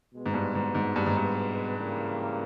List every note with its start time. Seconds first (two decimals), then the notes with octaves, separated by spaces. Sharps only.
0.14 B2 G#3 B3
0.26 G#2
0.34 G2
0.55 G#2
0.75 G#2
0.96 G2
1.06 G#2
1.17 G2
1.77 C#3 E3 G3 A#3